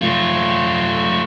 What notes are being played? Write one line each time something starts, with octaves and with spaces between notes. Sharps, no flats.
A3 F4